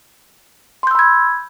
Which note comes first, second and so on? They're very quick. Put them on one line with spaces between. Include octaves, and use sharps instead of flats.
C6 G6 E6 B5 G#6